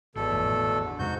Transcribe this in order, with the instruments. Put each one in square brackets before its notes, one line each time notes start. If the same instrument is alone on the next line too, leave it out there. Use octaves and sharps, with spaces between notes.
[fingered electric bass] G#1 [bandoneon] E2 B2 A4
[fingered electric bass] G#1 F2 A2
[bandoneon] D3
[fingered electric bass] F2 C3 G#3 [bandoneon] G#2 F#4 G6